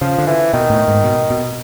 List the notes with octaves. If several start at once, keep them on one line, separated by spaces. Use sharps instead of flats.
C#3 F3
D3
E3
B2 D#3
A2
G#2
B2
B2